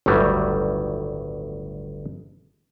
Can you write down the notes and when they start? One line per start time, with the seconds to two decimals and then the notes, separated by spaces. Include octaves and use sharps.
0.06 G1 D2 A2 D#3 F#3 G3